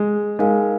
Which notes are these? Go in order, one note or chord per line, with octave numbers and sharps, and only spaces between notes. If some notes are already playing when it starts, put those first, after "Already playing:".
Already playing: G#3
G#3 D#4 A#4 F5 G#5